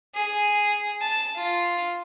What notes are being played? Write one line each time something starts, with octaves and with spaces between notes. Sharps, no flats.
G#4
A5
F4